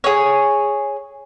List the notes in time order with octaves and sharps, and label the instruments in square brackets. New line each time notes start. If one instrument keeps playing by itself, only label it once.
[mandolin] G#4 C#5